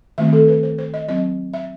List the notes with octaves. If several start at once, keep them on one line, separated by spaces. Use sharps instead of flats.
D#3 A3 C4 E5
A4
B4
C5
C5
D#5
F#3 C4 D#5
E5